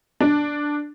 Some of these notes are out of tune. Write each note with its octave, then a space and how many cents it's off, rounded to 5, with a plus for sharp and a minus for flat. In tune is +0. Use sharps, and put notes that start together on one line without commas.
D4 +0